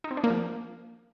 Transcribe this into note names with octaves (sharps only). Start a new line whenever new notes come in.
D#4
C4
D4
A#3
F3